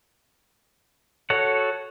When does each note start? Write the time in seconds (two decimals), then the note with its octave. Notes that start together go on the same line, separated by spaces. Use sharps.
1.30 F#4 A4 C#5 F#5